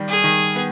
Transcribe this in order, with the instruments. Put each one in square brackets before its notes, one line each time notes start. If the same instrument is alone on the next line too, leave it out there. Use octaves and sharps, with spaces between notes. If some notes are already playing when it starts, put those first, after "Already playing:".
Already playing: [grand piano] D#3 G3
[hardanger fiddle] G#4
[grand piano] D#3
B3